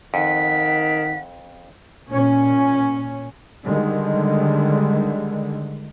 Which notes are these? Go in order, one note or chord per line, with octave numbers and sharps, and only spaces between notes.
F2 D#3 F#5 B6
A#2 C#4
D3 D#3 G3 G#3